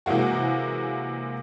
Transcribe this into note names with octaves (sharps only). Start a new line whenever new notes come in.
C3 E3 G#3 A#3 F#4